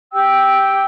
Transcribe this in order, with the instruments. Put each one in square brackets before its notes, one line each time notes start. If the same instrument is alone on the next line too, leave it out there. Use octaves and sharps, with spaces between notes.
[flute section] G4 G5 E6